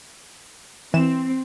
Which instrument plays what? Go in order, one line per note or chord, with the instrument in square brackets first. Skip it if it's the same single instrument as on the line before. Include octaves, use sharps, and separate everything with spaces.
[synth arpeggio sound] E3 E7 [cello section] C4